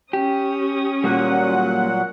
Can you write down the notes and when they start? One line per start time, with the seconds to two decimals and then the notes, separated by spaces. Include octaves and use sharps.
0.13 C#4 G4 D#6
1.04 A#2 F#3 G3 A#3 F#5